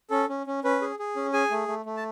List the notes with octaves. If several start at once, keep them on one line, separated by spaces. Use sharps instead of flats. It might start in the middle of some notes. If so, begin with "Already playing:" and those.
C#4 A4
C#4
C#4
C#4 B4
G#4
G#4
C#4
G#4 G#5
A3
A3
A3
A5